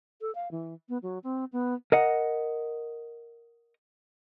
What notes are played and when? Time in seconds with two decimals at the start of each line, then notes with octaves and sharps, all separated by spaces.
0.21 A4
0.35 F5
0.51 E3
0.89 B3
1.03 F#3
1.24 C4
1.52 B3
1.92 A#4 D#5 F#5